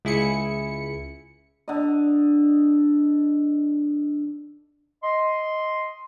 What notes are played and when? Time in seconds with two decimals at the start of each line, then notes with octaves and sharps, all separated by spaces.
0.05 C#2 E4 G#4 C#7
1.68 D3 D#5
5.03 D#5 C6